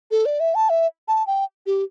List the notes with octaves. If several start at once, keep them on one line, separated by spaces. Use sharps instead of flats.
A4
D5
E5
A5
E5
A5
G5
G4